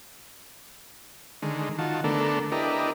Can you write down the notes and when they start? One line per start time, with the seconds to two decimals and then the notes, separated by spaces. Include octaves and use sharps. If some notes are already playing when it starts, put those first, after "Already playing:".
1.42 D3 D#3 G#3
1.78 D#3 F4 F#4 A5
2.04 D3 A3 B3 D4 A4 A#4
2.52 D4 E4 G4 A#4 B4 D#5